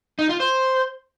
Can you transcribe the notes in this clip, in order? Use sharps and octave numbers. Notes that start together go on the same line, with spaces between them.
D#4
F4
C5